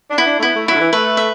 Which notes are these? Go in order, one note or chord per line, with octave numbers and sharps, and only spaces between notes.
D4
B3 E4
D4
A3
B3 E4
A3
F#3 E4
D3
E3
A3 B4
E5